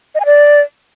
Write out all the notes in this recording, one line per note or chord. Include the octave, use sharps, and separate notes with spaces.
D#5
G#5
D5